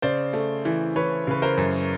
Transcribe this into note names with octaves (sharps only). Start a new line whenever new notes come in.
C#3 C5 D5
A3
E3
E3 B4 C#5
C#3 B4
A#4 C5
F#2